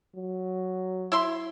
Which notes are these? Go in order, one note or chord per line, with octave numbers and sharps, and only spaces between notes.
F#3
E4 E5 C6